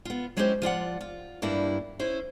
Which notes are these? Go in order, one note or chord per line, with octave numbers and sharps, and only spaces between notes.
B3 F4
F#3 G#3 C#4 E4 G4 C5
F3 F4 D5 F#5
F4
G2 G3 A#3 D4 E4
C#4 E4 C5